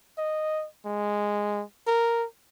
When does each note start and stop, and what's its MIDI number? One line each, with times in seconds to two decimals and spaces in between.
0.18 0.66 75
0.85 1.63 56
1.87 2.25 70